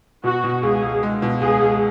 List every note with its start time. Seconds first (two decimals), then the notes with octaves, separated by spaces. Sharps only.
0.24 B2 F#4
0.44 B2
0.63 C#2 G#4
0.82 C#2
1.03 G#3
1.22 B2
1.41 C#2 G#4
1.61 C#2